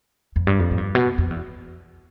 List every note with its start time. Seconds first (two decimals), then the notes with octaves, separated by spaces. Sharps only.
0.36 F2
0.47 G2
0.59 F2
0.71 A2
0.78 G2
0.95 B2
1.18 F2
1.30 E2